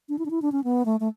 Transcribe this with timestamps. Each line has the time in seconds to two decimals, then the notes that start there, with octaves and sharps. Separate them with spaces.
0.09 D4
0.19 E4
0.26 D4
0.30 E4
0.42 D4
0.52 C#4
0.64 B3
0.85 A3
1.00 A3